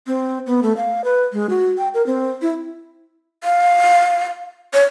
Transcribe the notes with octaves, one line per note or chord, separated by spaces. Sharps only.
C4
B3
A3
F5
B4
G#3
F#4
G5
A#4
C4
E4
F5
C#5